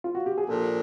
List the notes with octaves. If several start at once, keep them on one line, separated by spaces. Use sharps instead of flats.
F4
F#4
G4
G#4
A#2 F3 A#3 D4 G4 A4